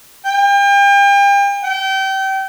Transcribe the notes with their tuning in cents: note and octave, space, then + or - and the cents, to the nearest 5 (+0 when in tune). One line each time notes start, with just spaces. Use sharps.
G5 +40
G5 -30